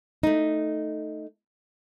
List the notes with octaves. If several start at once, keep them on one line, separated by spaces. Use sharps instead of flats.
A3 D#4